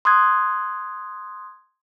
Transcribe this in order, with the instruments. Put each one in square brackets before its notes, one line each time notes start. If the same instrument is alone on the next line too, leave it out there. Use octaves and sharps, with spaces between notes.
[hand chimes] C6 D#6 F#6 G#6